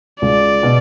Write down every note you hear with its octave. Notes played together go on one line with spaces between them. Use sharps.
C#2 D5
B2